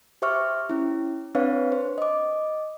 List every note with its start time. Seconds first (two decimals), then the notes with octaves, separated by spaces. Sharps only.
0.22 G4 C5 E5 C#6 D6 F6
0.70 C#4 E4
1.35 C4 D4 B4 C#5 F5
1.72 C5
1.98 D#5 D6